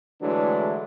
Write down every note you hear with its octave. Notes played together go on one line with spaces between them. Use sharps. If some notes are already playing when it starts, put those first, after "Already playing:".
D3 E3 F#3 G#3 A3 D4